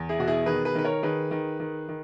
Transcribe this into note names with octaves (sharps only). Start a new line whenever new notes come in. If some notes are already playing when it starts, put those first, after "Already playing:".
Already playing: E2
E4 G#4
B2 F#4
E4 G#4
D#3 G#4 B4
G#4 B4
D#3 B4
A#4 C#5
D#3 G#4 B4
D#3
D#3
D#3